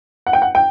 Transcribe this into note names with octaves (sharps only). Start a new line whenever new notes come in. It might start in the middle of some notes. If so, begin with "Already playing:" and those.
F#5
G5
F#5
G5